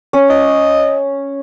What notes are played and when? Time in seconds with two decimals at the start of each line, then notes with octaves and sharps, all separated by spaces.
0.13 C#4
0.30 D#5